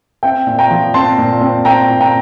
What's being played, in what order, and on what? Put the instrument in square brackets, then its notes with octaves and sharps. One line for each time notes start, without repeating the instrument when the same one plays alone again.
[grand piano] C4 E5 G5
A#2
G5 A#5
F3
C4 A5 C6
A#2
C4
C4 G5 A#5
A#2
G5 A#5